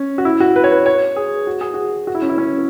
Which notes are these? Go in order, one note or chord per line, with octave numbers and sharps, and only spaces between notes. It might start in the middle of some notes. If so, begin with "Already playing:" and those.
Already playing: C#4
F#4
E4
F#4
B4
C#5
B4
C#5
G#4
F#4
G#4
F#4
F#4
E4
C#4
E4
C#4